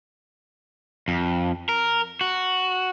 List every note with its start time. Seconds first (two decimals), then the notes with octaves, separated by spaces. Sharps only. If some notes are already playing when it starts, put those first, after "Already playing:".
1.08 F2
1.69 A#4
2.21 F#4